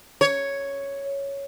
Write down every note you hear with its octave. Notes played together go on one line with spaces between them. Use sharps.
C#5